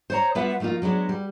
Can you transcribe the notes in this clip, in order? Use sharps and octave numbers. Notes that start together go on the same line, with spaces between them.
C5 C#5 A#5
G3 B3 F4 B4 E5 F#5
F3 A3 A#3 D#4 F4
F#3 G#3 B3 D4
G3